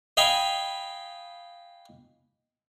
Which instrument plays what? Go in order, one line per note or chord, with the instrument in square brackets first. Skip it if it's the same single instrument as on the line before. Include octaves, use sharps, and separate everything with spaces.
[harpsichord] D#5 F5 G5 G#5 B5